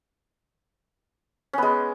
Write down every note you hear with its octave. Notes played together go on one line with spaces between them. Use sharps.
G#3 B3 C#4